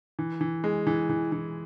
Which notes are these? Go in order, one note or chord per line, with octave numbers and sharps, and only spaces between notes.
E3
E3
G#3
E3
E3
E3